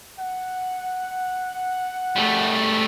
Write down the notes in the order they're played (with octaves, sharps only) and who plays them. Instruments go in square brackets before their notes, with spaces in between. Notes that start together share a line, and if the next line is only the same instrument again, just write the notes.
[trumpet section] F#5
[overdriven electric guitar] G3 A3